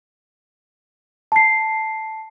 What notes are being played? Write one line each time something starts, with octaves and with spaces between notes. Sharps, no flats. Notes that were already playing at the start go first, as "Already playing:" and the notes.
A5 C7